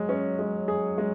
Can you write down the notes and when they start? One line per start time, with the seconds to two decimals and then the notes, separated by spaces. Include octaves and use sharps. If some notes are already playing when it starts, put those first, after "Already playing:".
Already playing: F#3 G#3
0.09 C#4
0.39 G#3
0.68 G#4
0.98 G#3